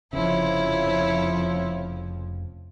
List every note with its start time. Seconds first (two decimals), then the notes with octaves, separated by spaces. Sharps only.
0.13 F1 F2 C#3 F3 E4 C#5